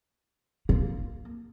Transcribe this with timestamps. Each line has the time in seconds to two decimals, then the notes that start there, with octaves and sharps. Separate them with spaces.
0.69 A#3